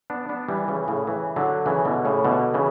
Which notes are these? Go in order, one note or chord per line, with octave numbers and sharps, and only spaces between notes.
B3 D4
B3 D4
E3 G3
C#3 E3
A2 C#3
C#3 E3
D3 F#3
C#3 E3
B2 D3
A2 C#3
B2 D3
C#3 E3